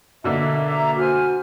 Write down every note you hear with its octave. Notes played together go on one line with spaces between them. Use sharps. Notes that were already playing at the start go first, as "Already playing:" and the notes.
B2 D3 A#3 D#5 E5
E5 A#5 D6
F#4 C5 G#5 F6